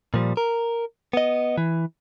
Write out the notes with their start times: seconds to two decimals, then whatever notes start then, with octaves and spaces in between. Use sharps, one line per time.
0.14 A#2 F3 G3
0.37 A#4
1.13 B3 D#5
1.58 E3